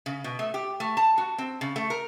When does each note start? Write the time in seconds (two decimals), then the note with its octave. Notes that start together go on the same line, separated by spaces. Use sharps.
0.06 C#3
0.24 B2
0.39 A3
0.54 G4
0.80 A3
0.97 A5
1.18 F#4
1.38 C4
1.61 C#3
1.76 A3
1.90 A#4